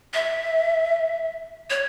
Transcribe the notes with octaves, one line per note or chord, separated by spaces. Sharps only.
E5
C#5